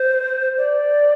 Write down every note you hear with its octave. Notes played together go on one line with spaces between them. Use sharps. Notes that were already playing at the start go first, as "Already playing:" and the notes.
Already playing: C5
D5